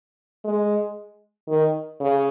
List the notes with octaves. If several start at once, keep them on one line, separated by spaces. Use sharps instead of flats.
G#3
D#3
C#3